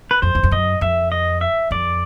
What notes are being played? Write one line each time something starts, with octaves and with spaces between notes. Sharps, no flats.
B4
F2 C5
E2
F2
F#2 D#5
F2 E5
D#5
E5
F2 D5